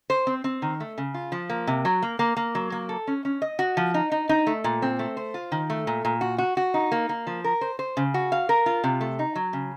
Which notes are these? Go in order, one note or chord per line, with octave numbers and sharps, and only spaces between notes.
C5
C4
C4
D#3
A3
C#3
F4
F3
A#3
C3
F#3
A#3
A#3
A#3
F#3
A#3
A4
C#4
C#4
D#5
F#4
F3
D#4
D#4
D#4
A3
A#2
C4
A3
C5
F4
D#3
A3
A#2
A#2
F#4
F#4
F#4
D#4
A#3
A#3
F3
A#4
C5
C5
C#3
F#4
F5
A#4
F4
C3
A3
D#4
F#3
C#3